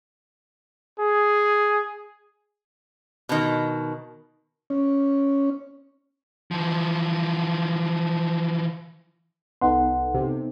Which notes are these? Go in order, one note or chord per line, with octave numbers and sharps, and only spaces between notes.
G#4
B2 D#3
C#4
E3 F3
C2 B3 D#4 A4 F#5 C6
C3